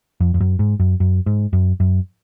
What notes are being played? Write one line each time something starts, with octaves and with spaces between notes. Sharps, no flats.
F2
F2
F#2
G#2
F#2
F#2
G#2
F#2
F#2